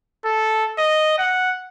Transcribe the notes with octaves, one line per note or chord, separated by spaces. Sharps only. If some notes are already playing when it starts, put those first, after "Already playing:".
A4
D#5
F#5